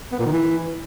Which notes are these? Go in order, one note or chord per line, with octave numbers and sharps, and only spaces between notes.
B3
A#2
D#3
E3